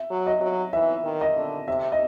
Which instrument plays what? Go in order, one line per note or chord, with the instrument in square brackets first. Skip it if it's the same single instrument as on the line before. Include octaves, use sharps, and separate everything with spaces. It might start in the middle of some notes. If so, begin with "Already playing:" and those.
Already playing: [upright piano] E5
[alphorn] F#3
[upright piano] D#5
[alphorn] F#3
[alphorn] E3 [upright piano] E5
[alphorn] D#3
[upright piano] D#5
[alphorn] D3
[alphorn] C3 [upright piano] E5
[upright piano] D#5